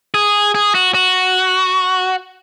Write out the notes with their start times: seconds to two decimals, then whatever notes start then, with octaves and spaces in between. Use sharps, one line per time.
0.14 G#4
0.55 G#4
0.75 F#4
0.94 F#4